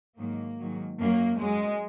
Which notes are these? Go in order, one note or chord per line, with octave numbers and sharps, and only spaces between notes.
G#2 D#3 F#3 A#3
G#2 D#3 F#3
F#2 F#3 A#3
F#2 F#3 G#3